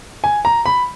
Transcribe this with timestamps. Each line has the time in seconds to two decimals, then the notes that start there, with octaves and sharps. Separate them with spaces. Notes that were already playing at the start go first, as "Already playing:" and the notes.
0.24 G#5
0.45 A#5
0.66 B5